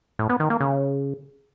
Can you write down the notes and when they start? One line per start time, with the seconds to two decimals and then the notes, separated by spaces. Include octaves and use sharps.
0.19 A2
0.29 B3
0.40 D#3
0.50 A#3
0.60 C#3